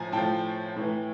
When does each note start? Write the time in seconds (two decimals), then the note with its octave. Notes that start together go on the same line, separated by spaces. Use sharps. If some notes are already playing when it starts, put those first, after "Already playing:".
Already playing: A2 F3 G#5 A#5
0.12 A2 F3 G5 A5
0.76 A2 E3